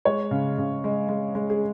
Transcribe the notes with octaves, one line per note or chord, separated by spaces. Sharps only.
G#3 C#5
C#3
C#3
G#3
G#3
G#3
G#4